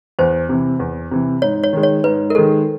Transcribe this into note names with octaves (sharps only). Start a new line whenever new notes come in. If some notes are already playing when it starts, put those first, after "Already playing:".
E2 C5
C3 E3
E2
C3 E3
G#2 C#5
C#5
D#3 G#3
C#5
G#2 B4
A#4
D#3 G#3 A4